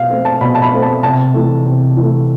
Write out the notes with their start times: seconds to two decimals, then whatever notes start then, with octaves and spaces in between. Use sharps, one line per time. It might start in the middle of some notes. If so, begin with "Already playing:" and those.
Already playing: B2 F5
0.09 A3 C4
0.25 A5
0.41 B2 B5
0.55 A5
0.62 B5
0.72 A3 C4
0.82 A5
1.03 C3 A5
1.34 E3 A3
1.65 C3
1.97 E3 A3